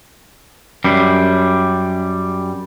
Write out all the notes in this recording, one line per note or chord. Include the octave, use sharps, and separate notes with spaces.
F#2 G3